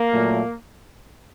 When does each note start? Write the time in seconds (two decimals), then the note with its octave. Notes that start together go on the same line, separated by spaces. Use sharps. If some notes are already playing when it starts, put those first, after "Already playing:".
Already playing: A#3
0.12 A#2 F#3 A3